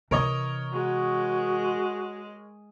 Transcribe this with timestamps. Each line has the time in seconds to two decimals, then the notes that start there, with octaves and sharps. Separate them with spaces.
0.11 C3 E3 A#4 C#5 D#5
0.73 G#3 F#4